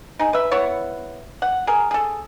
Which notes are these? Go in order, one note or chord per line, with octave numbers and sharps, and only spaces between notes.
D#4 G#4
B4 E5
B3 E4 C#5 F#5
F#5
G#4 A#4
G#4 A4